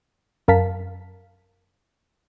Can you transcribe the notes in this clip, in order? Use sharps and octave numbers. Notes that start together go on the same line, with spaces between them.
F#2 A#4 F5 A5 B6